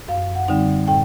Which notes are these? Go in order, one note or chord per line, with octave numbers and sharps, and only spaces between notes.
F#2 F5
F#5
D3 G3 C4 D#4
A2 G5